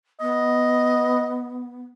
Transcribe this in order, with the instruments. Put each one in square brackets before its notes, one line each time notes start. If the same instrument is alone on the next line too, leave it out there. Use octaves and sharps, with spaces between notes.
[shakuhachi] B3 [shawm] D#5